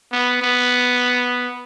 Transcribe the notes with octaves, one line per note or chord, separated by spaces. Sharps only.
B3
B3